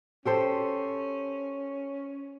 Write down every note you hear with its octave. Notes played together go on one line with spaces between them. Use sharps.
C#4 G4 A4 C5